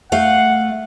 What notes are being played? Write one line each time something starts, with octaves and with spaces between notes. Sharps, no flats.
A3 F5 F#5